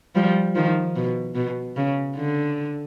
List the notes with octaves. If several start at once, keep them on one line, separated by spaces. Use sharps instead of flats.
F3 G3
D#3 F3
B2
B2
C#3
D3